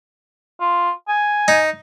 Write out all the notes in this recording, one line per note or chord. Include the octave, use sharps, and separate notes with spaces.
F4
G#5
D#4